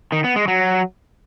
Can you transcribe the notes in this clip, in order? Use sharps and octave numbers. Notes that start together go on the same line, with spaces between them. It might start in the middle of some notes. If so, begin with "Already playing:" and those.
D#3
B3
G#3
F#3